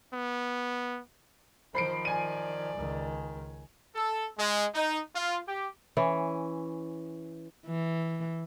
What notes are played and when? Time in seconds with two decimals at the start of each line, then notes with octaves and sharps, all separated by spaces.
0.13 B3
1.75 D#3 F3 C5 B5 C7 D7
2.05 D5 G#5 D#7
2.77 C#2 D#3
3.95 A4
4.38 G#3
4.75 D#4
5.15 F4
5.47 G4
5.97 E3 C#4
7.66 E3